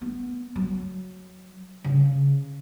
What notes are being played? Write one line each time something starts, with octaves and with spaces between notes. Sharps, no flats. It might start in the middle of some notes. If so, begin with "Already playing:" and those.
B3
F#3
C#3